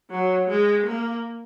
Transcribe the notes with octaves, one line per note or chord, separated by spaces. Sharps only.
F#3
G#3
A#3